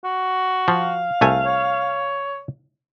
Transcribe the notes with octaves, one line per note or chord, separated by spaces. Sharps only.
F#4
F3 F5
C2 A3 G#5
C#5